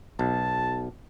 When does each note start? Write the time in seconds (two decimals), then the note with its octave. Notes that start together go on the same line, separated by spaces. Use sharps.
0.19 B1 A5